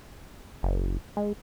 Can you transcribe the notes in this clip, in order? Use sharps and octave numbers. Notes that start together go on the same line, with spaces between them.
F#1
G#3